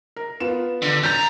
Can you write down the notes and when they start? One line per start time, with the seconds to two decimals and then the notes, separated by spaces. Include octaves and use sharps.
0.16 A#4
0.40 B3 F4 E7
0.82 D3
1.03 F#2 A#5 G6 A6